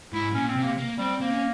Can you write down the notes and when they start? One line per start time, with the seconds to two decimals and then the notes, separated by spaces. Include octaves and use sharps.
0.13 G#2 E4
0.34 A#2 C#4
0.48 C4
0.56 C3
0.63 A#3
0.78 A#3
0.98 G3 C4
1.20 A#3 C4
1.31 C#4